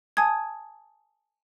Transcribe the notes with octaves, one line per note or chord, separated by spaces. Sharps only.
G#5 A5 D#6 G#6